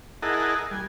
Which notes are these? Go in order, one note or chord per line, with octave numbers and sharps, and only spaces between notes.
E4 G#4 A#4 D#5 F#5 A5
G3 G#5